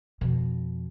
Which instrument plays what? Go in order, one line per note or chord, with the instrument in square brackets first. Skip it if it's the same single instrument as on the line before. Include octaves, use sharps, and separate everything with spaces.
[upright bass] F2 B2